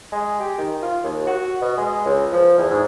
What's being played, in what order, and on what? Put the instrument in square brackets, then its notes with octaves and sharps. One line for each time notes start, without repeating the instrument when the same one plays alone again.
[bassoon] G#3
G4
D#3
F4
D#2
F#4
B2
G#3
C#2
F3
E2
G#2